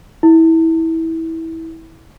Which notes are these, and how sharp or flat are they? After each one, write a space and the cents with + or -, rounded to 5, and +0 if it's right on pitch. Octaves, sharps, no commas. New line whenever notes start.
E4 -20